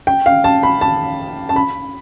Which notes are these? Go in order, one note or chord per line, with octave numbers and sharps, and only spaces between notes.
G5
F5
A5
B5
A5
A5
B5